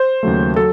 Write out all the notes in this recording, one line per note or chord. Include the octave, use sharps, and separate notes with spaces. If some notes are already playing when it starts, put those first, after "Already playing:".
Already playing: C5
D#2 C#3 F#3 A3
F#3 A4